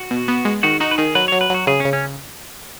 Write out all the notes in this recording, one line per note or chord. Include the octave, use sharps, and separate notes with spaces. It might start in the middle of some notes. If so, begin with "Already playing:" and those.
Already playing: F#4
B2
B3
G#3
D#3 F#4
D#4 F#4
B4
D#3 G#4
F#3 B4
F#3 C#5
B4
F#3 F#4
C#3 G#4
C#4
C#3
C#4